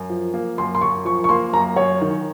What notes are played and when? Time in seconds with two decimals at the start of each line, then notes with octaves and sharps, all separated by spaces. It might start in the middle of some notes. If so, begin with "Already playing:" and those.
Already playing: F#2
0.10 F3
0.34 A#3
0.58 F#2 C6
0.75 C6
0.81 F#2 C#6
1.05 F3 C#6
1.24 C#6
1.29 A#3 C6
1.53 F#2 A#5
1.76 F#2 C#5
2.01 D#3